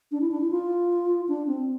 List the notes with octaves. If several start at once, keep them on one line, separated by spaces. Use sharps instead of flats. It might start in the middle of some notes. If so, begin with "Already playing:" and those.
D4
E4
D4
E4
F4
D4
C4